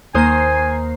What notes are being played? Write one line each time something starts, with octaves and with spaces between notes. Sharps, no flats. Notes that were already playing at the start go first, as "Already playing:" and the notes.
D#2 A#3 C5 G#5 A#5 D#6 C7